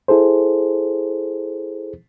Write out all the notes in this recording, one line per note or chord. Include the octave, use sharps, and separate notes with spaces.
E4 G#4 A4 C5